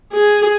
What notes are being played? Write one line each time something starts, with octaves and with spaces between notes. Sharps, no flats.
G#4